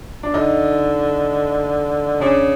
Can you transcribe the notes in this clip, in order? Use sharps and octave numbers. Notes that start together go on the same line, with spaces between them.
D4
D3 D#4
C#3 D4